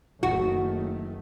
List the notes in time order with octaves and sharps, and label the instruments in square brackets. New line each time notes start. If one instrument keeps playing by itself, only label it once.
[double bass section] F#1 D#3 A3 [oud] F#4